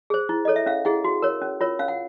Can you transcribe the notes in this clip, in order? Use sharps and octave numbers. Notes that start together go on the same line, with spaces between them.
G#4 C5
E4
A4 C#5 D#5
E5
C#4 F5
E4 G#4 F#5
F#4
A#4 C#5
C#4
F4 A#4 C#5
C#4 F5
F#5